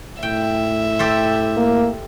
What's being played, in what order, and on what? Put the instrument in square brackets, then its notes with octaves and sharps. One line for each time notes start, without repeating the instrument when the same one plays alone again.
[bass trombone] A2 [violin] E5 [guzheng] G5
[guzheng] G4 A4 C5
[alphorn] A#3